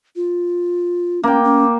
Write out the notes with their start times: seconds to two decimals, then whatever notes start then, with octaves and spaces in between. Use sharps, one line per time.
0.16 F4
1.23 A#3 C#4 G5
1.44 C#4